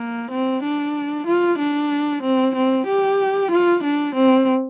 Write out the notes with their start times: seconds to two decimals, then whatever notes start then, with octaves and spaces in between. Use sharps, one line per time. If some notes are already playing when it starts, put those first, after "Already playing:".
Already playing: A#3
0.31 C4
0.64 D4
1.27 F4
1.58 D4
2.23 C4
2.55 C4
2.87 G4
3.51 F4
3.83 D4
4.15 C4